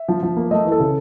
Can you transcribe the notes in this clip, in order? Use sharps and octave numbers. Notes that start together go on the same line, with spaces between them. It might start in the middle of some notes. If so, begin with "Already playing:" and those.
Already playing: E5
F3
F3
A#3
A3 D#5
E3
A4
C#3